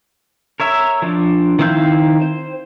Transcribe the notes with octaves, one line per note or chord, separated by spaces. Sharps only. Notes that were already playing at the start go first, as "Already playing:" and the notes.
A#4 C#5 E5
F3 D4
D#3 C4 E4 F5 G6
C5